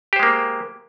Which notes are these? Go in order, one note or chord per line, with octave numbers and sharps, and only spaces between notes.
G#3 A#3 G4 C5